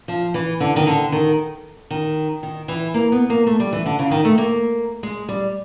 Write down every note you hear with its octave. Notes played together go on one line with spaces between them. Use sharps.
F3
E3
D3
D#3
D3
D#3
D#3
D#3
E3
A#3
B3
A#3
A3
G3
E3
D3
C#3
D#3
A3
A#3
G#3
G3